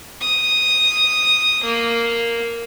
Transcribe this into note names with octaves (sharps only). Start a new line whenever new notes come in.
D#6
A#3